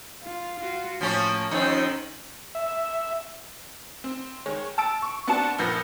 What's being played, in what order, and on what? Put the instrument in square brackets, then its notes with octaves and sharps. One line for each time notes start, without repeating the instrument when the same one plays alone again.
[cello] F4
F4 F#4
[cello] A2 [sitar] F3 A#3 C#4
[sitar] F2 D#3 D#4 [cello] C#4 C5
[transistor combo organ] E5
[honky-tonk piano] C4
D#3 G#3 C#5
A5 E6 D7
C#6
B3 C4 D4 F#4 F#5 A5
A#1 F3 A#3 B4 G6 A#6